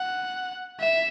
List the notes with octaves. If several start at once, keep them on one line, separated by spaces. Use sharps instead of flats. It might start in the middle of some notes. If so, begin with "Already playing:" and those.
Already playing: F#5
E5